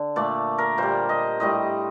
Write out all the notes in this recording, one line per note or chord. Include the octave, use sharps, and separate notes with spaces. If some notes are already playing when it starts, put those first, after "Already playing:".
Already playing: D3
A#2 A3 D5
A#4
A#2 G3 C5
D#5
A2 G3 D#5